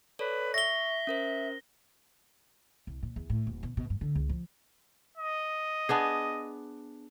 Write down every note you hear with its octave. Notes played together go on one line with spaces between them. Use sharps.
A4 B4 C#5 D5
E5 C#6 A#6 G7
C#4 A#4 C5
C2
A#2
E2
A2
D#1
B2
B2
G2
D3
C#2
F3
D#5
B3 D4 G#4